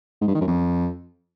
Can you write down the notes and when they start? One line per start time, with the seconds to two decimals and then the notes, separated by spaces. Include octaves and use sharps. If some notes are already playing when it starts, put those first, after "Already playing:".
0.21 G#2
0.28 G2
0.34 D#3
0.41 F#2
0.48 F2